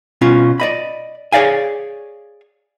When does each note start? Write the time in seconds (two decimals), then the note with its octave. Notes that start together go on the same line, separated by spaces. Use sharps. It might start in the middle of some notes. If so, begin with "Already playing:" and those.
0.21 B2 C#4 F4
0.60 D5 D#5 B5
1.32 G#4 C#5 D5 F5 G#5